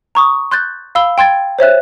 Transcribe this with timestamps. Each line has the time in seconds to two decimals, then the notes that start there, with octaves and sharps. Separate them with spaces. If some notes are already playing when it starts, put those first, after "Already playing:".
0.15 A#5 C#6 D#6
0.51 C6 F#6 G6 A6
0.95 F5 B5 E6 G7
1.18 G5 C6 G#6 A6
1.59 C5 C#5 E5 F#6